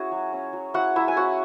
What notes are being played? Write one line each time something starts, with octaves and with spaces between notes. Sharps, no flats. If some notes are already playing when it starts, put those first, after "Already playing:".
Already playing: C#4 E4 F#4 G#4 F#5
F#3
C#4
F#3
E4 F#4 F#5
F#3 E4 E5
G#5
C#4 F#4 F#5